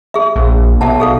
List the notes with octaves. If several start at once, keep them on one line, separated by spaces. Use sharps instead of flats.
G#4 E5
A#1
B1 E5 F#5 A5
G#4 A4 F5